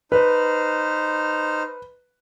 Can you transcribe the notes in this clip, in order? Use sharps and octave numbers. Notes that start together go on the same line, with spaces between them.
D#4 B4 C5 F6